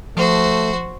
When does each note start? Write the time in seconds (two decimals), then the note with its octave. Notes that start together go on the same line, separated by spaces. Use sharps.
0.17 F3 A3 F#4 C5